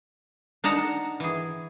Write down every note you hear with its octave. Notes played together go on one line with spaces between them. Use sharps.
D4 D#4 F#5 A5 A#5
E3 G#4